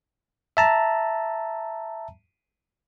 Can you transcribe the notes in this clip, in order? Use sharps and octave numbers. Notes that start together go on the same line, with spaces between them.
E5 A5 A#5